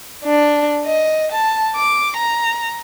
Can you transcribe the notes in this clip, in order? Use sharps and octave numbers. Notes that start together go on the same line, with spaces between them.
D4
D#5
A5
D6
A#5